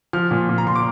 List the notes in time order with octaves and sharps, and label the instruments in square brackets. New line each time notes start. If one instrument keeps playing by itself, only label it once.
[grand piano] F3 F6
A#2
A#2
A#5
A#2 C6
D6